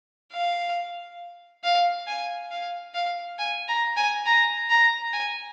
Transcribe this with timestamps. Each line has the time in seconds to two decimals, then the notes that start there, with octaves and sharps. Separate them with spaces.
0.33 F5
1.64 F5
2.07 G#5
2.51 F5
2.95 F5
3.39 G#5
3.68 A#5
3.97 G#5
4.26 A#5
4.70 A#5
5.13 G#5